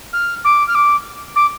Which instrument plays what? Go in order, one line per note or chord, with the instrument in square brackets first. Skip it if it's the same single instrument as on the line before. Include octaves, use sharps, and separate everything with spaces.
[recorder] F6
D6
F6
D6
D6